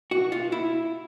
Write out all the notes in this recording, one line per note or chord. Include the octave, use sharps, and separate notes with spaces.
F#4
F4
E4